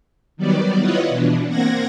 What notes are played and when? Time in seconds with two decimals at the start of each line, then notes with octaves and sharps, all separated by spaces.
0.37 D#3 F#3 G3 B3 D5
0.79 E4 F4 B4 C#5 D#5 F#5
1.09 B2 E3 D4
1.48 A#3 C4 F#5 G#6 A#6